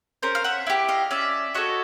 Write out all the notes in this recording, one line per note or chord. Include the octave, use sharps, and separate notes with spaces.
C#4 A#4 C5
F5
E5 F#5
E4 G4
D#5 F5
C#4 D5 E5
F#4 A4 C#5 D#5